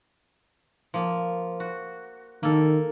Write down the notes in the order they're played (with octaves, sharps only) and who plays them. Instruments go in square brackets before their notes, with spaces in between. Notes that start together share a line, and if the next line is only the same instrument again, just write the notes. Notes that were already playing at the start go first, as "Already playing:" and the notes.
[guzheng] F3 A#3
F#4
[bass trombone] D#3 [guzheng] A#3 A4